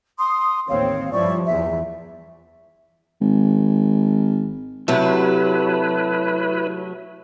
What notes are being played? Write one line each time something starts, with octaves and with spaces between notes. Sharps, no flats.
C6 D#6
A1 D#2 C4 C#5 F5
G2 F3 G3 E4 D5 C#6
E2 E5
G#1
C3 F#3 A3 E4 B4